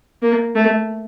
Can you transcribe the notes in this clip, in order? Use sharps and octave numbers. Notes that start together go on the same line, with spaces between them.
A#3
A3